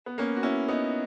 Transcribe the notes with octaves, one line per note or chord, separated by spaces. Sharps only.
B3
A#3 C#4
F#4
C#4 E4
B3 D#4